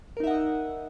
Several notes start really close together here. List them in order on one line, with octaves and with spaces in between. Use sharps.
A#4 D#4 E5 F#5 D#5